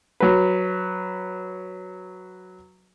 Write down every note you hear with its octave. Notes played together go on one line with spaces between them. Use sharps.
F#3 B4